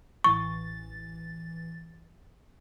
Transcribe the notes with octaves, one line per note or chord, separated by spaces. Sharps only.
A1 E3 C#6 A6